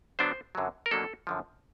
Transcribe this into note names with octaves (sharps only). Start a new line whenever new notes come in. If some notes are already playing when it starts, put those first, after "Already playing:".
D3 F#3 B3 D4 C5
F#2 D3 F#3
A#4
B2 F#3 A#3 D4 A4
F#2 D3 F3